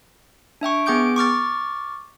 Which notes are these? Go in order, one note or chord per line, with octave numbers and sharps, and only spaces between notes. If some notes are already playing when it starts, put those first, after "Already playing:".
D4 E5 G5 C#6
B3 G#4 G5 D6 G6 D7
C#6 D6 F6 A6